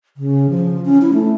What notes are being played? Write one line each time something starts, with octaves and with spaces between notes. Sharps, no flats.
C#3
F3
C#4
E4
A3